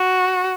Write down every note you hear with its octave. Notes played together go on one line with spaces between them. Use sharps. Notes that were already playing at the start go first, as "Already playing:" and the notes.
Already playing: F#4